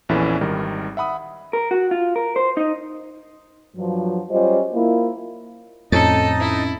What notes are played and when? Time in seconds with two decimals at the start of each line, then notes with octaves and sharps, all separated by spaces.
0.09 A#1 E2 E3 C#4 E4 A4
0.41 G#1 D#3 G3 A#4
0.97 E5 F#5 B5 D#6
1.53 A#4
1.71 F#4
1.91 F4
2.16 A#4
2.36 C5
2.57 D#4
3.76 G2 F3 F#3
4.30 F#3 G3 C#4 F4 C5 D#5
4.73 A#3 E4 F4
5.92 F2 A2 C#4 D#4 A4 D#5 A6
6.40 E4